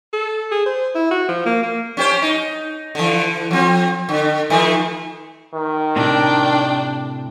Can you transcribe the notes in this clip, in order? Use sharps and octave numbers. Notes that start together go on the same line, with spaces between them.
A4
G#4
C5
E4
F#4
F3
A#3
A#3
C#4 G4 C5
D#4
D3 E3
F3 C4
D3
D#3 F3 A3
D#3
A2 C3 D4 G5